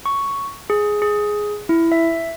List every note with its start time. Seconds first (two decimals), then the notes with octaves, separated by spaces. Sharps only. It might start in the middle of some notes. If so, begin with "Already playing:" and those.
0.06 C#6
0.70 G#4
1.02 G#4
1.69 E4
1.92 E5